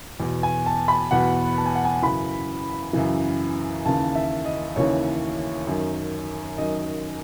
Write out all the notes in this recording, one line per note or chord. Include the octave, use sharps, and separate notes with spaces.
E2 B2
G#5
A5
B5
E2 B2 F#5
A5
G#5
F#5
G#5
F#2 C#3 E3 B5
F#2 C#3 E3
D#2 C#3 E3 A5
E5
D#5
D#2 C#3 E3 C#5
F#2 D#3
F#2 D#3 D#5